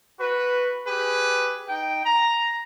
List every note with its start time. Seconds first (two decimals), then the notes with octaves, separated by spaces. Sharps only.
0.20 F#4 B4
0.87 G4 G#4 B4
1.69 D#4 G5
2.05 A#5